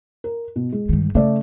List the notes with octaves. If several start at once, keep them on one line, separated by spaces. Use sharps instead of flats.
A#4
B2
G#3
G2 D#3
C#3 A3 D5